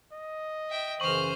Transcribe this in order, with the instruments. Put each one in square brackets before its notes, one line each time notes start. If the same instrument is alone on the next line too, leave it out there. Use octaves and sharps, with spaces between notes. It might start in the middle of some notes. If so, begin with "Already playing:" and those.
[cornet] D#5
[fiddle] E5 G5
[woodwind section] F#2 C#3 E3 [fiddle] C5 F6 [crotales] C#6 F#7